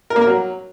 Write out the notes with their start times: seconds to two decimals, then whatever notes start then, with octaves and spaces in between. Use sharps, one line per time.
0.10 A#4
0.16 A#3
0.22 A#4
0.27 F#3